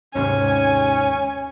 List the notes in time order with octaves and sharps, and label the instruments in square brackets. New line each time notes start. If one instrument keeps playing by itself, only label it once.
[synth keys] D#2 G#2 C3 [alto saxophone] C#4 [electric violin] G#5